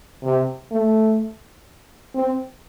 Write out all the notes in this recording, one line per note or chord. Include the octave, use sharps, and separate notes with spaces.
C3
A3
C4